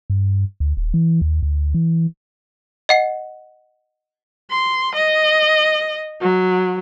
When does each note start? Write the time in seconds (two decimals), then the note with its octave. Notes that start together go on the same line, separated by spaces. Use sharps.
0.10 G2
0.60 D2
0.77 D#1
0.94 E3
1.21 D#2
1.43 D2
1.74 E3
2.89 D#5 F#5 C7
4.51 C6
4.95 D#5
6.21 F#3